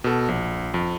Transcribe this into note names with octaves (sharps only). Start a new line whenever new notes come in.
B2 A4
A#1
F2